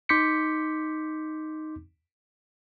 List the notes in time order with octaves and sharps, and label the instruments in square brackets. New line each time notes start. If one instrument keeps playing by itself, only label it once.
[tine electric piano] D#4 C6 D6 G6 B6 C#7